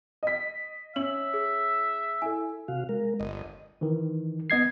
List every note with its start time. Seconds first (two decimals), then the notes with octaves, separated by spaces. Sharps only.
0.23 D#5 B6
0.96 C#4 E5 F#7
1.34 G#4
2.22 E4 A4 G#5
2.68 C3 F#4 F5
2.89 G#3 A#4
3.20 G1 D#5
3.81 D#3 E3
4.50 B3 D#5 G#6 C7